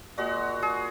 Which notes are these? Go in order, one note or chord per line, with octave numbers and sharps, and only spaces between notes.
A#2 G#3 F#4
G#4